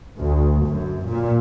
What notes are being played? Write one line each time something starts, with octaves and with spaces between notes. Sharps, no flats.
D2
F#2
A#2